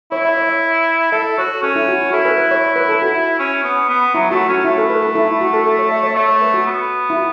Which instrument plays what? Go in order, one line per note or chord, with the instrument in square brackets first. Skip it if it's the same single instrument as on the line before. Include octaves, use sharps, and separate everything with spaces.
[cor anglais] E4 [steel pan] C#5
[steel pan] E5
C#5
E5
[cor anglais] A4 [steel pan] E5
[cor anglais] F#4 [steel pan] C#5
[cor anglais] C#4 [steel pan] A4
[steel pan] E4
F#4
F#4
[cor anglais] E4 [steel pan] A4
[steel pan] B4
B4
C#5
C#5
B4
A4
F#4
[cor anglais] E4
C#4
B3
B3
[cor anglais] F#3 [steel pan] E4
[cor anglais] A3 [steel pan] F#4
[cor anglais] C#4 [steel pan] F#4
[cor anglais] A3 [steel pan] E4
[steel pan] A4
B4
A4
E4
E4
F#4
A4
A4
C#5
E5
C#5
[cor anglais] A3 [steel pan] E5
[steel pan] C#5
B4
F#4
[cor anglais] B3
[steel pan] E4
F#4